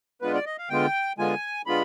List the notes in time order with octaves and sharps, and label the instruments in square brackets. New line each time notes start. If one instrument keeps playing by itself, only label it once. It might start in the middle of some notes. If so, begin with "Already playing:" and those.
[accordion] D3 G#3 B3 F4 B4
D5
D#5
F5
D3 G#3 B3 F4 G5
D3 G#3 B3 F4 G#5
D3 G#3 B3 F4 B5